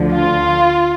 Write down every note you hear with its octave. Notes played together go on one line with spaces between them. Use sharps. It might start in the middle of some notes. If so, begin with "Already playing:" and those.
Already playing: D2 D3 F3
F4